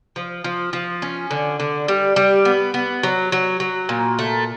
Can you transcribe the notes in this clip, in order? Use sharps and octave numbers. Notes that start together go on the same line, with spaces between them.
F3
F3
F3
C#4
D3
D3
G3
G3
B3
B3
F#3
F#3
F#3
A#2
A3